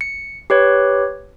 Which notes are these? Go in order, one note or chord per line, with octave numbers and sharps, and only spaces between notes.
C#7
G4 B4 C#5